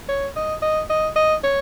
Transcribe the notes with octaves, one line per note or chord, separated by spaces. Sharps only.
C#5
D#5
D#5
D#5
D#5
C#5